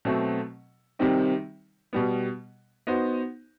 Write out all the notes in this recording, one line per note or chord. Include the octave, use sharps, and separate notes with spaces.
B2 F#3 A3 C4
C3 D#3 G3 C4 D#4
B2 G3 B3
B3 D#4 F#4 C5